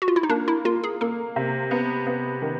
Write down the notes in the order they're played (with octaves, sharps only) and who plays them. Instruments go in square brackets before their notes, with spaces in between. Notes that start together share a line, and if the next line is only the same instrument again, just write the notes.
[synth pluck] F#4
F4
E4
D#4
[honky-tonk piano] A#3 [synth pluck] D4
[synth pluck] E4
[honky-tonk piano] A#3 [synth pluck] F4
[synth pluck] G#4
[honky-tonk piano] A#3 [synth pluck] A4
[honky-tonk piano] C3
B3
B3
D#3